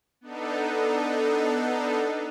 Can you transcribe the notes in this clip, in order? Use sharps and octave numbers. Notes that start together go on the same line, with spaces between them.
B3 D4 D#4 A4